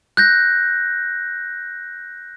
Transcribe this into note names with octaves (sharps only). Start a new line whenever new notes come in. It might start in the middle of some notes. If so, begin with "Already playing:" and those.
F#6 G6 A#6